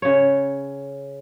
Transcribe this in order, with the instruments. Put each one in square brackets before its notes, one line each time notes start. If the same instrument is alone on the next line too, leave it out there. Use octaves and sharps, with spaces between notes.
[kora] C#3 C#5